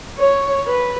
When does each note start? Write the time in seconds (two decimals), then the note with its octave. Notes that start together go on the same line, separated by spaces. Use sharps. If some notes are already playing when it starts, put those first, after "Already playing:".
0.19 C#5
0.67 B4